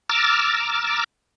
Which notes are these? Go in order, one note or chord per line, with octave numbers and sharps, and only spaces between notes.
A#5 D6 E6 F6 A6